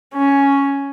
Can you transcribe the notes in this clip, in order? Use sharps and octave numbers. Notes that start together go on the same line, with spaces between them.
C#4